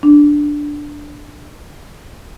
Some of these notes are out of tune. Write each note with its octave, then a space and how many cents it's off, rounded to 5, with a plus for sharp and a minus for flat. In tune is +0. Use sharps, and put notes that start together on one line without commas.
D4 +0